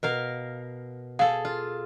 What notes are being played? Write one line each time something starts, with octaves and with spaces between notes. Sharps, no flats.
B2 A#4 F5
G#4 A4 F5
F4